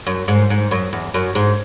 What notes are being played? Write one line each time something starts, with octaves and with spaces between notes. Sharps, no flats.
F#2
G#2
G#2
F#2
E2
F#2
G#2